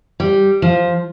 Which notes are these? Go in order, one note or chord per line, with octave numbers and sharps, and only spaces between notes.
G3
F3